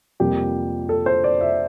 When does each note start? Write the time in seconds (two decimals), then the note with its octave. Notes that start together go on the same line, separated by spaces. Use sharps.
0.20 F2 C3 G3 A#3 G4
0.89 A4
1.06 C5
1.24 D5
1.41 E5